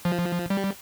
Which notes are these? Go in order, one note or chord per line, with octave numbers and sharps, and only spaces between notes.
F3
G3